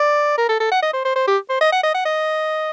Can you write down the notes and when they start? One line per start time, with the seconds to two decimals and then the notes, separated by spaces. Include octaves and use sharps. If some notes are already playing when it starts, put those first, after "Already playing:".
Already playing: D5
0.37 A#4
0.49 A4
0.60 A4
0.71 F#5
0.82 D#5
0.93 C5
1.05 C5
1.16 C5
1.27 G4
1.49 C5
1.61 D#5
1.72 F#5
1.83 D#5
1.94 F#5
2.05 D#5